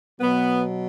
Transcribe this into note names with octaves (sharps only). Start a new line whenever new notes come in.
B2 F#3 B3